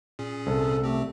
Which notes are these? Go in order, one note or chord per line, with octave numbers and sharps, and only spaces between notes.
A#2 C#4 G#4
C2 A4
A3 C4 G4